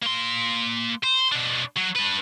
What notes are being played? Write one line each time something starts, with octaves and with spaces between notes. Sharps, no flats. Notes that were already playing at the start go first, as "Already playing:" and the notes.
A#3 C6
C5
B2 D4
F#3
D4 B4